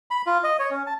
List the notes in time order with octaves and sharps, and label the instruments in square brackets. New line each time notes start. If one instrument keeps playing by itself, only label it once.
[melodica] B5
F4
D#5
C#5
C#4
A5